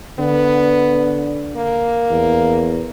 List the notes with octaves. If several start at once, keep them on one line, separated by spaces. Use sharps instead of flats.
D3 B3
A#3
E2